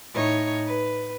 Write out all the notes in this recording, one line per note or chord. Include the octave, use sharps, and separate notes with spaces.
A2 D#4 C#5
B4